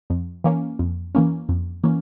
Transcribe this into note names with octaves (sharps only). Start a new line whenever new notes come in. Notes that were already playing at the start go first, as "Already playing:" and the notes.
F2
E3 A#3 C#4
F2
E3 A#3 C#4
F2
E3 A#3 C#4